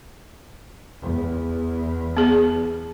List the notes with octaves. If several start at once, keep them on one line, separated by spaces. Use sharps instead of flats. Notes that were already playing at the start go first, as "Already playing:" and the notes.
E2
B3 G#4